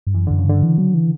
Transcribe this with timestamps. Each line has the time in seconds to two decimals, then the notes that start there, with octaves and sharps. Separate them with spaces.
0.07 G2
0.14 F#2 E3
0.27 F#2 D3
0.39 C#3
0.46 G2 D3
0.63 E3
0.78 F#3
0.94 E3